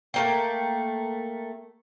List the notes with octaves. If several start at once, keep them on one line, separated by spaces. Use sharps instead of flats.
A3 A#3 G5